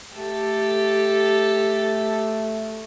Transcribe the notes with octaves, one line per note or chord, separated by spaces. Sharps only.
A3 G4 A4